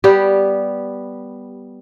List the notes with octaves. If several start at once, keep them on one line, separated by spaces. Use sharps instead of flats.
G3 B3 G4